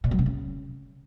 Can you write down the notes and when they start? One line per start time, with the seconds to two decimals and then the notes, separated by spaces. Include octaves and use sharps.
0.04 A#2
0.11 F#3
0.19 C3
0.26 C#3